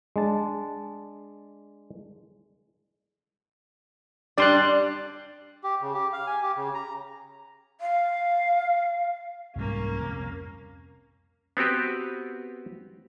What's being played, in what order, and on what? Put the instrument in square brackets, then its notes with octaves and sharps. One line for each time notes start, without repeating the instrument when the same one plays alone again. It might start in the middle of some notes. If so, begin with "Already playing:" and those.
[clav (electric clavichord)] G#3 D4 A5
[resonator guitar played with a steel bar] G3 D4 [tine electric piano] D5 C6 F#6
[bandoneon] G4
C#3
G4
F5
G#5
G4
C#3
A#5
[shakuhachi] F5
[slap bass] C2 G#2 G3 [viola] A#3 C#4
[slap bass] C2 F2
[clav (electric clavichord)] B3 C4 F#4 G4 B4